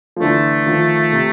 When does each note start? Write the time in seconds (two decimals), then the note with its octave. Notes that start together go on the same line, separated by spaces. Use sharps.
0.16 F3
0.20 D3 E3 A3
0.66 D#3 F3
1.13 C3